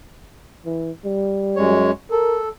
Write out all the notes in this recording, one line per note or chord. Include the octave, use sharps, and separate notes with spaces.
E3
G3
F#2 G#3 C#5
A4 A#4